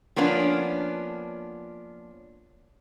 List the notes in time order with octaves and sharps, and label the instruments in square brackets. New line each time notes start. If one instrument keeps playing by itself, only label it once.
[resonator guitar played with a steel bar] F3 A#3 B3 C#4 D4